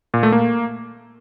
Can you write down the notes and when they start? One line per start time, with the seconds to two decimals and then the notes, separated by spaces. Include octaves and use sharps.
0.14 A#2
0.23 A3
0.32 A#3